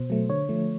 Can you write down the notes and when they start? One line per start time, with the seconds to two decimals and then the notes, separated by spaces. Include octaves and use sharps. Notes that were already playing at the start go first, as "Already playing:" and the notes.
Already playing: B2 C5
0.10 F#3 A3
0.30 D3 C#5
0.49 F3 A3